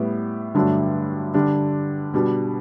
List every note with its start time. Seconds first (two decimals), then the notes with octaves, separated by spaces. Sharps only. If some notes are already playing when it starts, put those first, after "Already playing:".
Already playing: A2 G3 B3
0.55 G2 D3 F#3 A3 D4
1.34 D3 G3 D4
2.14 B2 G3 D4